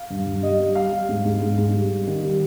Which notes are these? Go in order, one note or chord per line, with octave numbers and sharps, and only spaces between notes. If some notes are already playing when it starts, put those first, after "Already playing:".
Already playing: F5
G2
G2
G3 D#5
G3
G3 F5
G3
G#2
G#2
G#2
G#2
G3
G3
D#3
G3